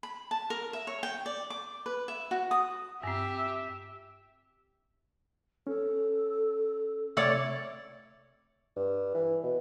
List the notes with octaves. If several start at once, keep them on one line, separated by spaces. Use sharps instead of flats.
B5
A5
A#4
E5
C#5
G5
D5
D6
B4
E5
F#4
D#6
G2 C4 G4 E5
C#4 A4
C3 A3 E4 C#5 D5
G2
E3
B2